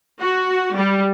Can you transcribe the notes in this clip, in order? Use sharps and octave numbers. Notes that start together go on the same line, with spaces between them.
F#4
G3